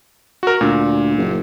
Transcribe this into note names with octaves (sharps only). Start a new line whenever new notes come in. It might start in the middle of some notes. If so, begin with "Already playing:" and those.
F#4 A#4
D2 A#2
F#1